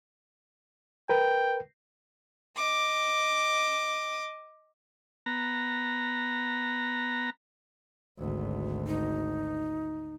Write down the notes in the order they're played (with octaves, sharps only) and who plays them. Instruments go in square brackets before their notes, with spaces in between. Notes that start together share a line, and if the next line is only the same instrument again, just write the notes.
[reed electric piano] A#4 B4 [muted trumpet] G5
[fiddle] D#5 D6
[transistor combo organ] B3 A#5
[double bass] G#1 D2
[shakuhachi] D#4